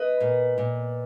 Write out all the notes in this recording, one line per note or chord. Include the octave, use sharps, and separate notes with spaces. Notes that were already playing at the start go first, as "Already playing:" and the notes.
Already playing: B4 D#5
A#2
A#2